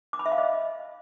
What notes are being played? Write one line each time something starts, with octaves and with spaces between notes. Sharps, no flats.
D6
B5
E5
F5
D#5